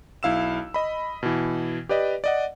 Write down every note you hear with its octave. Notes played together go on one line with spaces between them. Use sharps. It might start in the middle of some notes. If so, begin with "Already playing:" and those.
B1 E4 F5 E6 E7
D#5 B5
B2 E3
G4 B4 D5 D#5
D5 D#5 F#5